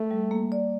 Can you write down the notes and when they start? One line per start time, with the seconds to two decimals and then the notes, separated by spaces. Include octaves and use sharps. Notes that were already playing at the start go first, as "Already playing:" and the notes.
Already playing: A3
0.11 G3
0.31 A#3
0.52 D5